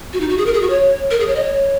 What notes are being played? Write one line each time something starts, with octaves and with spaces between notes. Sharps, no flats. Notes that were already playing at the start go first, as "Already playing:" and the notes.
F#4
D#4
F#4
G#4
A#4
G#4
F#4
C#5
A#4
G#4
C#5
D#5
C#5